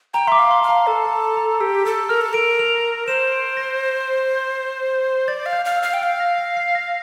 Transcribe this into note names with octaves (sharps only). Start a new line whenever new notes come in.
G5 A#5
E5 C6 D6
F5
C6
F5 A5
A#5
A4 A5
A5
A#5
A#5
G4 E6
A4 E6
A#4 F6
A4
A#4 D7
F7
C5 E7
D7
A#6
D5 A6
F5
G6
F5
F6
E6
F5
G5
F5 F6
A#6
C7
C7
A#6